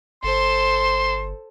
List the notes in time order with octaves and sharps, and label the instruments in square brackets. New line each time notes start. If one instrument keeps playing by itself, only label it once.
[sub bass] G1 [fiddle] A4 C5 [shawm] C6